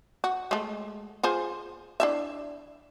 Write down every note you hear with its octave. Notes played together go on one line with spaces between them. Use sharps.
F#4
G#3 A3
F4 G#4 C5
D4 E4 E5